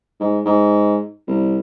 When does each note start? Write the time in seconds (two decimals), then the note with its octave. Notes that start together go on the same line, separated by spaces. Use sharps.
0.20 G#2
0.45 G#2
1.28 C2